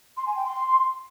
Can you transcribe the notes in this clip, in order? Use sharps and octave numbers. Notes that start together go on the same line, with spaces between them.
C6
G#5
G5
C6